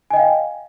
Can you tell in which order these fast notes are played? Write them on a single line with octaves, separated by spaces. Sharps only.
G#5 D#5 G5 F5